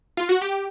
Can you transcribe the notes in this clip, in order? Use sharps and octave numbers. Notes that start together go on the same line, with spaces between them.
F4
F#4
G4